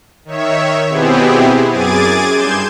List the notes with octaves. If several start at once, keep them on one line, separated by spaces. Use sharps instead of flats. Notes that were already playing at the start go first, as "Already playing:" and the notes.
D#3 C#5 E5
B2 B3 C4 E4 G4 G#4
F#2 G#4 D6 G#6 A6 D#7
G2 C6 G6 G#6 E7